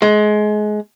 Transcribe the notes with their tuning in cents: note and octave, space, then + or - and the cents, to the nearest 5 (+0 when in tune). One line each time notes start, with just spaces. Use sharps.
G#3 +25